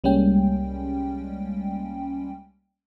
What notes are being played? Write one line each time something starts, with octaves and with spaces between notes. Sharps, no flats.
C2 G3 G#3 A#3 C#4 G5